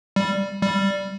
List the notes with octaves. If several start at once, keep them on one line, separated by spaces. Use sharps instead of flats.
G3
G3